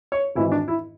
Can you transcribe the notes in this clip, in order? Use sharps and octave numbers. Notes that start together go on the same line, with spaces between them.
C#5
G#1 G#2 E3 E4
D4
E4